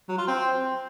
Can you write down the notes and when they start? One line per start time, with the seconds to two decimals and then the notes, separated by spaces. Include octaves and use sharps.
0.08 F#3
0.18 F4
0.27 C4